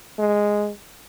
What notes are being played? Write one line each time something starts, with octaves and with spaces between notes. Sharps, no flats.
G#3